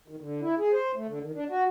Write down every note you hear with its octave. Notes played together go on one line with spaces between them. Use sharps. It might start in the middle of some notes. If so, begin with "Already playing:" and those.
D#3
D3
E4
G#4
C5
A3
D3
D#3
D4
F#4